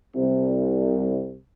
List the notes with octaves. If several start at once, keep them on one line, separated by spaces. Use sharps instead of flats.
C2